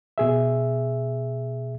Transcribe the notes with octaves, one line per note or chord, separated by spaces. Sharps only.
B2 G#4 E5